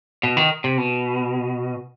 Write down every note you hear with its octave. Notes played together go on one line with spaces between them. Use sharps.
B2
D#3
C3
B2